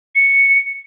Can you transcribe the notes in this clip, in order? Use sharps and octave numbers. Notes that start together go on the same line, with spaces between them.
C#7